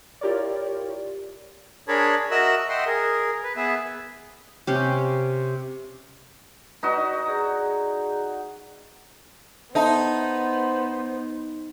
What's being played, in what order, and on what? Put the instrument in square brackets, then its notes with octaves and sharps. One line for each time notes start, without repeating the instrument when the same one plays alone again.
[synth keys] E4 F4 G4 A#4 C#5 D5
[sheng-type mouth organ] D4 G#4 A#4 C#5 A5 B5
F#4 A#4 D#5 E5 E6 F#6
D#5 E5 F#5 G5 C6
G#4 A#4
B4
B3 G#4 B4 E5
[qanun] C3 C#4 G4
[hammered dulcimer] D#4 F#4 [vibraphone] B4 D5 D#5
[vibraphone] G#4 D5 A#5
[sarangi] B3 [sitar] D#4 [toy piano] A4 E5 A5 [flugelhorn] C5